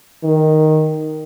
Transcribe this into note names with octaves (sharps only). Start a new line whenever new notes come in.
D#3